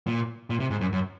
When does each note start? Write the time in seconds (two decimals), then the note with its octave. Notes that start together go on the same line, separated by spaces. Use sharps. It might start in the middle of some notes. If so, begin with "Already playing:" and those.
0.07 A#2
0.50 A#2
0.60 C3
0.70 G#2
0.81 F#2
0.92 F#2